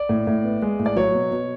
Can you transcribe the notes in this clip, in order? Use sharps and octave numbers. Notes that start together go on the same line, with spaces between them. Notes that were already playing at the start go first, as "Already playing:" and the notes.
Already playing: D5
A2
A2
B3
G#3
A2
D5
F#3 C#5
B2
B2